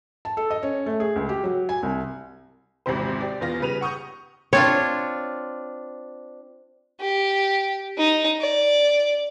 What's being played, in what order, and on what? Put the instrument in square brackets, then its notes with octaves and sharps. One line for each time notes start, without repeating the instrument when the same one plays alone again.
[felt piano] A5
A4
D#5
C#4
A3
G#4
C#2
G4
F#3
G#5
C2
[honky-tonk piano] G#1 E2 C3 C5
G4 D5
E2 B3 F4 A#6
C#3 G3 B4 D#7 F7
F#5 C#6 D#6 G6
[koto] C4 D4 F4 [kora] C#5
[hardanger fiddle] G4
D#4
D5